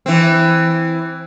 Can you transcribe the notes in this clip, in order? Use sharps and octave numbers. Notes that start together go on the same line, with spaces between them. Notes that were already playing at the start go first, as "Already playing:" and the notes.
E3 C4